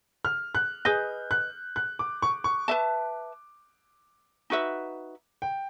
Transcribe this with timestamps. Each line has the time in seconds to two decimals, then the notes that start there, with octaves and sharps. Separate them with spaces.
0.25 F6
0.55 F#6
0.85 G#4 B4 D#5 G6
1.31 F#6
1.76 F#6
1.99 D6
2.22 C#6
2.44 C#6
2.68 B4 E5 A5
4.50 D#4 F#4 B4 E5
5.42 G5